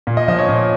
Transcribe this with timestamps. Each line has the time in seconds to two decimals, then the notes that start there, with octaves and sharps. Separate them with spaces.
0.07 A#2
0.17 D#5
0.28 F3 D#5
0.39 C#5
0.49 A#2